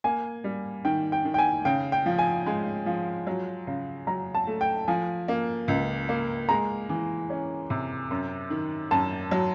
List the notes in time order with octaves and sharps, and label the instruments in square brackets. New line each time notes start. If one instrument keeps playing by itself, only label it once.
[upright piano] A#3 [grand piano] G#5
[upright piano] G3
[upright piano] D#3 [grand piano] G5
[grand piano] G5
[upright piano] D#3
[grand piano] G5
G#5
[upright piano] C#3 [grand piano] G5
[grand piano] G5
[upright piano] F3
[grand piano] G#5
[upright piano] G#3
F3
F#3
C#3
[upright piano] F#3 [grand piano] A#5
[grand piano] A5
[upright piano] A3
[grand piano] G5
[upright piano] F3 [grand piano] G#5
[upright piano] A#3
C#2
A#3
[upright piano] G#3 [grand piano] A#5
[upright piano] E3
C#4
C3
F#2
D#3
[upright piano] F#2 [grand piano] A5
[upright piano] F#3